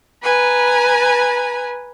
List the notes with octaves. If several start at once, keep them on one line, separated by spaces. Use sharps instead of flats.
B4 G#5 A#5